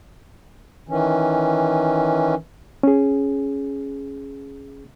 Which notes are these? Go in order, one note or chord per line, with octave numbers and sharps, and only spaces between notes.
D#3 E3 C#4
C#4 G#4